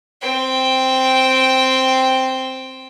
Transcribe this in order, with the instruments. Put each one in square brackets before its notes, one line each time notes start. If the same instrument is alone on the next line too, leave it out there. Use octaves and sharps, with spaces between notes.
[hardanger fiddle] C4 G5